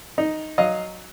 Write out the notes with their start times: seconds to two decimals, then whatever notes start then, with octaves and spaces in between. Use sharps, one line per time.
0.18 D#4
0.58 F#3 D#5 F5